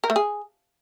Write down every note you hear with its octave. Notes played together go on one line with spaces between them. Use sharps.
A#4
A3
G#4